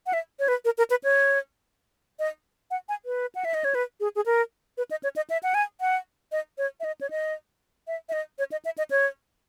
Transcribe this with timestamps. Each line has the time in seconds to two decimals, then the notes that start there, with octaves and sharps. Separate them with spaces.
0.06 F#5
0.13 E5
0.39 C#5
0.48 B4
0.65 A#4
0.78 A#4
0.90 B4
1.04 C#5
2.19 D#5
2.71 F#5
2.89 G#5
3.06 B4
3.35 F#5
3.45 E5
3.54 D#5
3.64 C#5
3.75 B4
4.00 G#4
4.16 G#4
4.26 A#4
4.78 B4
4.91 D#5
5.03 C#5
5.16 D#5
5.30 E5
5.43 F#5
5.54 G#5
5.81 F#5
6.32 D#5
6.58 C#5
6.80 E5
6.84 D#5
7.01 C#5
7.10 D#5
7.87 E5
8.09 E5
8.13 D#5
8.39 C#5
8.52 D#5
8.65 E5
8.78 D#5
8.91 C#5